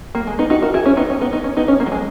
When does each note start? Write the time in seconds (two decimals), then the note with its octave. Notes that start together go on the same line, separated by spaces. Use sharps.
0.15 A#3
0.27 G#3
0.39 B3 D#4
0.50 D#4 F#4
0.62 F#4 A#4
0.74 E4 G#4
0.86 C#4
0.97 B3 D#4
1.10 C#4
1.21 B3 D#4
1.33 B3 D#4
1.44 C#4
1.57 B3 D#4
1.68 C#4
1.80 A#3
1.86 F#3
1.92 G#3